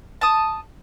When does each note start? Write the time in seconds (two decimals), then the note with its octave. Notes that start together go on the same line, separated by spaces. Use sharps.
0.21 A5 D#6